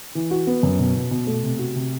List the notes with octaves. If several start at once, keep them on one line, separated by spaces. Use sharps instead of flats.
E3
F#4
B3
F#2
B2
B2
B2
A3
C3
F#4
C3